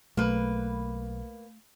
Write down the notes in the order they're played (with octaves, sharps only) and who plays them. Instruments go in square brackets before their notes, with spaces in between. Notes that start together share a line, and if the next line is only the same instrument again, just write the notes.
[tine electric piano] B1 [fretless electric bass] A3 [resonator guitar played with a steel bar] A#3 B4